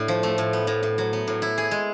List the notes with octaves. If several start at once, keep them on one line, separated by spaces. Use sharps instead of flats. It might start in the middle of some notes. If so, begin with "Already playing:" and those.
Already playing: A2 D4
F3
A3
A2
B3
A2
A2
F#3
B3
A2
E4
G#4
G#3